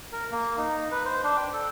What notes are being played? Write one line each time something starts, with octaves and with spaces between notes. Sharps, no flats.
A#4
A#3
D#4
B4
C5
D4
G5
A4